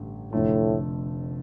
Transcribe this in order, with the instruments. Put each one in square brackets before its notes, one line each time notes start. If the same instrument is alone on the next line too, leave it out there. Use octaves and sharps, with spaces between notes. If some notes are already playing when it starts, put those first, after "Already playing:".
Already playing: [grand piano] A1 G2 D3 A3
[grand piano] F1 F2 D3 A3 [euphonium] A2